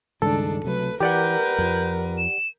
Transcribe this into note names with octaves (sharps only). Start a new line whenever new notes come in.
C#2 G2 D#3 G#3 D4 A4
C3 F#3 A3 B4
E3 G4 A#4 B4 D5 F#5 G6
F2 F3
E7